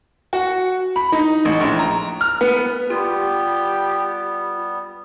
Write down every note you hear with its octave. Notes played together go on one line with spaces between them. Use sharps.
F#4
B5
D#4
A1
A#1
A#5
F6
B3
G3 B3 F4 G4